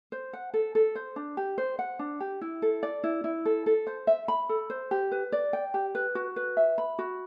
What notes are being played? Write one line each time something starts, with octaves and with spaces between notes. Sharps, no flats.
C5
F#5
A4
A4
C5
D4
G4
C5
F#5
D4
G4
E4
A4
D5
E4
E4
A4
A4
C5
E5
B5
A4
C5
G4
B4
D5
G5
G4
B4
F#4
B4
E5
B5
F#4